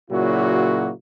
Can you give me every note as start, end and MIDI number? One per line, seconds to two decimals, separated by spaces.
0.11 0.90 46
0.11 0.90 49
0.11 0.90 54
0.11 0.90 58
0.11 0.90 64
0.11 0.90 66